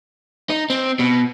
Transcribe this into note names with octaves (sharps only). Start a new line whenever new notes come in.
D#4
C4
B2